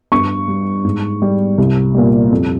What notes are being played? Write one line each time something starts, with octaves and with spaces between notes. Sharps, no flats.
G2 C#6
G3
G#2
G3
C2
A#2 G3
F2